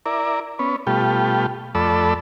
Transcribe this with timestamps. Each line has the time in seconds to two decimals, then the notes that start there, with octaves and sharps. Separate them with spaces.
0.06 E4 A#4 D5
0.59 B3 C#4
0.87 B2 G3 A3 F4 G4
1.75 F2 A3 A4 D5 B5 E6